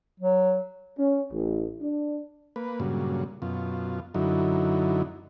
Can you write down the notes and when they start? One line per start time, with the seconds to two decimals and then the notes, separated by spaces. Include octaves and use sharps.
0.20 F#3
0.98 C#4
1.32 A1
1.80 D4
2.56 A#3 B4
2.80 G2 A#2 C#3 F#3
3.42 F#2 B2 F4
4.14 F#2 D3 F#3 D#4 E4